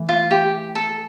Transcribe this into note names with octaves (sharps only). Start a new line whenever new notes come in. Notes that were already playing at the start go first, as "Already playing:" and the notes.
Already playing: E3 A3
F4
G4
A4